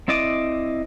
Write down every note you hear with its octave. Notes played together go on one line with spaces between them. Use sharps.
C4 E4 D5 D#5 D6